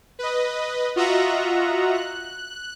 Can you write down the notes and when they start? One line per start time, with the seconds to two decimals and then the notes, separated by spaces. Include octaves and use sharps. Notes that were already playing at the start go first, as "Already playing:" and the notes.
0.19 B4 D#5
0.96 F4 F#4 D#5 E5 F#5 A#5
1.94 F#6